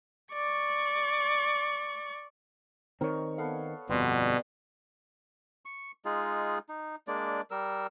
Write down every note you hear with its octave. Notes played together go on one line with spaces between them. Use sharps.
D5 C#6
D#3 C4 A#4 C#5
B3 A4 F5
G1 F2 B2 G3 B3 C6
C#6
G#3 D#4 F4 G#4
D#4
G#3 A#3 D4 D5
G3 A#4 E6